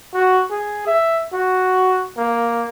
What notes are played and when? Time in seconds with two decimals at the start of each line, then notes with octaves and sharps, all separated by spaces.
0.14 F#4
0.50 G#4
0.87 E5
1.33 F#4
2.18 A#3